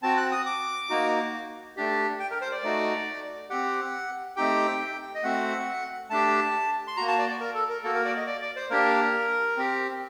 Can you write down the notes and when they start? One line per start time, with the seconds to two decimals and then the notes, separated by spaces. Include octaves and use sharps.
0.02 C4 F#4 A5
0.17 F#6
0.32 D#6
0.46 D6
0.90 A#3 D#4 F#4
1.77 A3 D4 G4
2.20 G5
2.31 A#4
2.41 C5
2.52 D5
2.63 A3 D#4 F#4
3.50 C4 G4 F#5
4.36 A3 C4 D#4 G4 G5
5.15 D#5
5.23 A3 C4 F#4 F#5
6.10 A3 D4 G4 A5
6.88 C6
6.97 A#3 F#4 A#5
7.08 A5
7.19 D5
7.29 D5
7.40 A#4
7.54 A4
7.69 A#4
7.83 A#3 F#4 A4
7.94 A#4
8.05 D5
8.16 D#5
8.27 D5
8.41 D5
8.56 C5
8.70 A#3 D4 G4 A#4
9.57 C4 G4